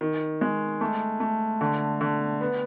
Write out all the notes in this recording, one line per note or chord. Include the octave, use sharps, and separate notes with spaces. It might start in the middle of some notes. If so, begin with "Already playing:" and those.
D#3
G#3
A3
A3
D3
D3
B3